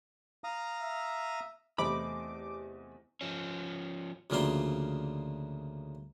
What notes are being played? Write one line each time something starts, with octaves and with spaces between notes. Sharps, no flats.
F5 A#5 D#6
E5
E2 C3 A3 C5 D#5 B5 D6
F3 C#4
D2 C#3 F3 A#3 D5 C6